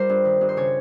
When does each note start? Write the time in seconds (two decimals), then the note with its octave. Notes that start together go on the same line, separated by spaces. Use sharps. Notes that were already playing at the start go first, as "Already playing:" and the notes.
Already playing: G3 F4 A#4 C5
0.09 G2
0.25 D#3
0.41 G2
0.49 C5
0.57 C#3 C#5